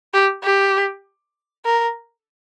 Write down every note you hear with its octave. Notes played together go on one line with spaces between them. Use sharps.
G4
G4
A#4